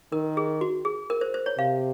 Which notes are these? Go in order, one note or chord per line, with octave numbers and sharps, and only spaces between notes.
D#3 A#4
G#4
F#4
G#4
A#4
C5
C5
C#5
C3 F5